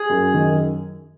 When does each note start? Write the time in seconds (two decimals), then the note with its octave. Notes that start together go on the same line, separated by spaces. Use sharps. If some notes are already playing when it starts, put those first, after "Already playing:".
Already playing: G#4
0.09 F#2
0.34 D#3